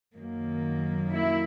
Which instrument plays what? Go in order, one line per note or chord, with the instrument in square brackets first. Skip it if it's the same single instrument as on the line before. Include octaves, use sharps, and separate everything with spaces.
[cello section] F#2 D#3 F#3 A#3
E4